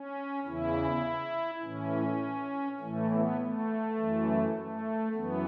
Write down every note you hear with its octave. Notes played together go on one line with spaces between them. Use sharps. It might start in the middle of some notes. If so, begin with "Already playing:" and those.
Already playing: C#4
E2 C#3 E3 E4
A2 E3 C#4
A2 E3 A3
B3
A3
F#2 E3
A3
F#2 E3 B3